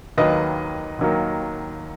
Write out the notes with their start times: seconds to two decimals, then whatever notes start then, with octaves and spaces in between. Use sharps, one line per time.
0.18 D#2 D#3 F#3 A#3 B4 D#5
0.99 D#2 D#3 F#3 A#3